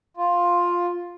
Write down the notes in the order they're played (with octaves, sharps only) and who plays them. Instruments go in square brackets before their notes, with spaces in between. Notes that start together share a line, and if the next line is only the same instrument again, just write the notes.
[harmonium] F4